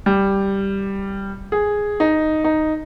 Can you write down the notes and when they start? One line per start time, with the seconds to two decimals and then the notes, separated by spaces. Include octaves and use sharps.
0.06 G3
1.52 G#4
2.00 D#4
2.44 D#4